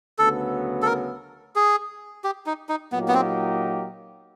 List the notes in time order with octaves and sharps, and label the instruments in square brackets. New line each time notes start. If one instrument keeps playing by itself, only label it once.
[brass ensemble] D2 C#3 F#3 B3 [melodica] A4
[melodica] A4
A#4
G#4
G4
D#4
D#4
[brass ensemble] A#2 F#3 A#3 D#4 G4 [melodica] B3
[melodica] B3
C4